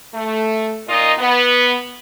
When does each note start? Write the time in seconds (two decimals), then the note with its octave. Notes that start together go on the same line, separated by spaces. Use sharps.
0.15 A3
0.88 A#2 D#4 F4 D#5
1.19 B3